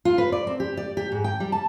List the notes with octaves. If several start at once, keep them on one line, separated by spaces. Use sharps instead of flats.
F4
B4
D5
C4
G4
D5
G4
G#2
G5
G3
A5